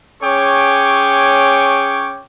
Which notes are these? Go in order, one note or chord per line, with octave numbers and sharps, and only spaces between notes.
C#4 G#4 C#5 G5 C#6 D6